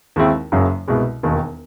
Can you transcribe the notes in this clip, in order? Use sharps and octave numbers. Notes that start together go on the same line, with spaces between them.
D#2 D#3 G#3 C4 E4
F#1 F#2 C#3 F#3
C2 B2 G#3
E1 D#2 D#3